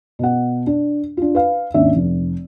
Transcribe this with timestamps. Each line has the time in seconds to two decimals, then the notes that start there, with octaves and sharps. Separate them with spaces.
0.19 B2 F#5
0.67 D4
1.17 D4 F4
1.35 B4 F5
1.74 G#1 D#2 C#4 D4 E5
1.96 F1